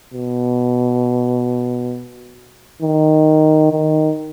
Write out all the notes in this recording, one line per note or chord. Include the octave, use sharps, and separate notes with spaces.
B2
D#3
D#3